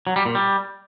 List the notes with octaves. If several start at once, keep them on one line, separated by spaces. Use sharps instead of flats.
F#3
G3
A#2
G3